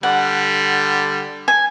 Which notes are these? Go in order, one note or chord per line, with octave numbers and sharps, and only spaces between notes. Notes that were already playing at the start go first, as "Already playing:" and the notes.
D3 G3 F#5
G#5